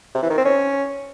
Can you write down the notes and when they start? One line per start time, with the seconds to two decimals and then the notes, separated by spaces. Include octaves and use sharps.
0.15 C3
0.22 E3
0.30 D#3
0.38 C4
0.45 C#4